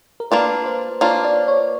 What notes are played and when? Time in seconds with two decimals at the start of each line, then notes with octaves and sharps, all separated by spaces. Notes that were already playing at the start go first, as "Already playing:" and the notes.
0.20 A#4
0.31 A#3 D4 F4 B4
0.66 C5
1.01 A#3 D4 F4 C#5
1.24 D5
1.48 C#5